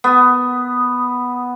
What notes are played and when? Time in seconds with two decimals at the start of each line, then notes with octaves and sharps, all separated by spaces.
0.04 B3